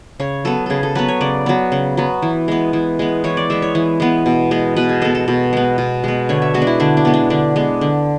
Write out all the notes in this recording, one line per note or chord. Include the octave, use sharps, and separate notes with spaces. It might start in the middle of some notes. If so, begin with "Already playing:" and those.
C#3 C#5
F#3 B3 A4
C#3 G#4 A4
A4
F#3 B3 B4
C#5
C#3 D5
F#3 B3
C#3
F#3 B3
E3
G#3 B3
E3
G#3 B3
E3 C#5
D5
G#3 B3 E5
C#5
E3
G#3 B3
B2
G#3 B3
B2 B4
G#4
G#3 B3 A4
A4
B2
G#3 B3
B2
G#3 B3
D3 C#5
E5
G#3 B3 F#4
D4
E4
D3 D4
D4
G#3 B3
D4
D3 D4
G#3 B3
D3